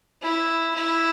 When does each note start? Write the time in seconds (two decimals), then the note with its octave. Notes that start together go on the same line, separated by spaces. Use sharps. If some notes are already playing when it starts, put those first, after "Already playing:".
0.22 E4
0.75 E4